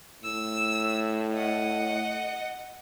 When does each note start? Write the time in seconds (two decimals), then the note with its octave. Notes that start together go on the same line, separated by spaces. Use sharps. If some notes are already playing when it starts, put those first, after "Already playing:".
0.24 A2 E6
1.33 D#5 F#5